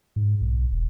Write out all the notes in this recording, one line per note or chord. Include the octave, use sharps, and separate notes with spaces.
G#2
B1
E1